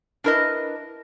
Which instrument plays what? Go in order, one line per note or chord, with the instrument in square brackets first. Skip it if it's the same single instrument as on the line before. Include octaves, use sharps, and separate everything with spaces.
[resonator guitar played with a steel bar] D4 E4 A#4 B4 D#5